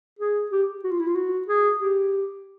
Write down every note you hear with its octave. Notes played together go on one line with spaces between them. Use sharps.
G#4
G4
F#4
F4
E4
F4
F#4
G#4
G4